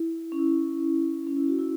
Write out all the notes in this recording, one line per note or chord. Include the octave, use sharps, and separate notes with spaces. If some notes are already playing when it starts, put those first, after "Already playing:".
Already playing: E4
C#4
E4
C#4
E4
F#4
E4